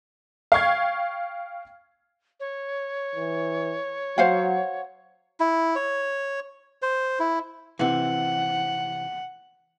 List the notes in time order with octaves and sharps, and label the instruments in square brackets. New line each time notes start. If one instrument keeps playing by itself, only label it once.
[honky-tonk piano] F5 G5 C#6 G#6
[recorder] C#5
[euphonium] E3
[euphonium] F#3 [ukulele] C5 F5 F#5
[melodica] E4
C#5
C5
E4
[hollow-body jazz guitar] C3 E3 [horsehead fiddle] F#5